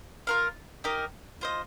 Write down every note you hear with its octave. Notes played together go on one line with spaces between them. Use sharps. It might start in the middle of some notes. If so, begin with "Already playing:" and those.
F4 A#4 F5
D#4 G4 A#4 D#5
F4 C5 D#5